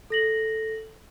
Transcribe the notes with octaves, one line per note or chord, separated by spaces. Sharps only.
A4 A#6 F#7